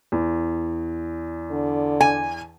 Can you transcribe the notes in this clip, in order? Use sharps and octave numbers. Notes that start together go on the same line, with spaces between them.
E2
D3
G#5